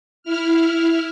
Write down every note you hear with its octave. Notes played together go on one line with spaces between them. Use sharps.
E4 F6